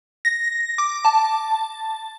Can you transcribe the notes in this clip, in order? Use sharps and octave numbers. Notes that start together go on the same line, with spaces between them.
A#6
D6
A5